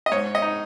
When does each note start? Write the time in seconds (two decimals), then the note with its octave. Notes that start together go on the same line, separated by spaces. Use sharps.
0.06 D#5
0.12 G#2 C#5
0.35 D#5
0.42 D#4